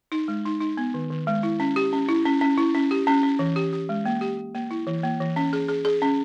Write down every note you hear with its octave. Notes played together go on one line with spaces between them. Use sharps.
D#4
G#3
D#4
D#4
B3
D#3
D#3
G#3
E4
C#4
G4
C#4
E4
C#4
C#4
E4
C#4
G4
C#4
C#4
E3
G4
G4
G#3
A#3
G4
G4
A#3
E4
E3
A#3
E3
C#4
G#4
G#4
G#4
C#4